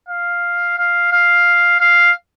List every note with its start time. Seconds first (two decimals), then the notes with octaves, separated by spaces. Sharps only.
0.08 F5
0.78 F5
1.11 F5
1.80 F5